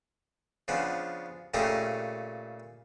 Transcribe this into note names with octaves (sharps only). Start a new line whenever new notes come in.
C#3 F3 B3 D4
A#2 C#3 A3 G4 A#4 D#5